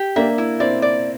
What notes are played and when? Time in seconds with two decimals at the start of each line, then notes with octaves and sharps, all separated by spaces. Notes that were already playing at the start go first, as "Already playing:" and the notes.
Already playing: G4
0.16 A#3 D4 E5
0.38 E4
0.60 C4 E4 D5
0.82 D5